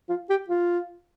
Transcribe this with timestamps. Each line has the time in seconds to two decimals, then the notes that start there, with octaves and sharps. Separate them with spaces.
0.09 F4
0.30 G4
0.49 F4